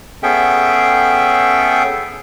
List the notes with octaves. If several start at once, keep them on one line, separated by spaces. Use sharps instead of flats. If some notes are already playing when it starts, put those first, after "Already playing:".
B3 C#4 G#4 A4 E5 G5